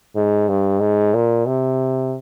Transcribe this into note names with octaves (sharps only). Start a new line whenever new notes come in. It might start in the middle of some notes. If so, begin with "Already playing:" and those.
G#2
G2
G#2
A#2
C3